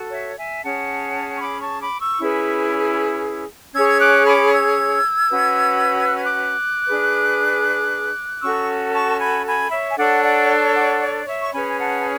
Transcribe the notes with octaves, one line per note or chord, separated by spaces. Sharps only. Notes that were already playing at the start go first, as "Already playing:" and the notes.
Already playing: F#4 A4
C#5 E5
E5 G#5
C#4 G#4 C#5 F#5 A5
C#6
B5 D6
A5 C#6
B5 D6
C#6 E6
C#4 E4 G#4 B4
C#4 G#4 C#5 E6 G#6
G#6
D6 F#6
B5 D6
E6 G#6
C#4 F#4 B4
F#6
G#6
D6 F#6
D4 G#4 B4
C#4 F#4 A4 C#6 E6
A5 C#6
G#5 B5
G#5 B5
C#5 E5
G#5
D4 A4 C#5 D5 F#5
D5 F#5
D5 F#5
D5
C#5 E5
C#6
C#4 G#4 B4 G#5 B5
G#5
F#5 A5
A5